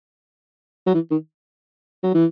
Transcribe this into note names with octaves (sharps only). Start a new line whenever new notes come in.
F#3
E3
D#3
F#3
E3